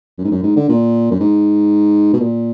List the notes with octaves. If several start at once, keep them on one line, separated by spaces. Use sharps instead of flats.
F#2
G#2
F#2
G#2
D3
A#2
F#2
G#2
B2
A#2